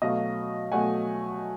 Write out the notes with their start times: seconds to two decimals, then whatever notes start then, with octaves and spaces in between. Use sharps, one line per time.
0.02 B2 F#3 A3 D#5 F5
0.72 B2 F#3 A3 F#5 G#5